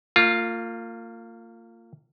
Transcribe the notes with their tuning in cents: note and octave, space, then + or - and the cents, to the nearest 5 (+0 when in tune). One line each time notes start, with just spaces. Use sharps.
A#3 -35 F4 +0